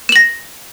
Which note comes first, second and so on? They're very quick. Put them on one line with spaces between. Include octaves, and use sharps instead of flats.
E7 F#7 A#6